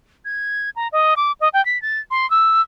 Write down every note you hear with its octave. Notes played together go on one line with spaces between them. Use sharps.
G#6
A#5
D#5
D6
D#5
G5
B6
A6
C6
E6